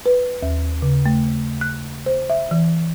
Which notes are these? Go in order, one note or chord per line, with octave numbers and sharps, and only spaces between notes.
B4
D#2
C#3
A3
F#6
C5
E5
E3